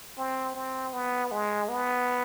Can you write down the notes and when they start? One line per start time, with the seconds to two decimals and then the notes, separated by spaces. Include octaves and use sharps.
0.17 C4
0.55 C4
0.93 B3
1.31 G#3
1.69 B3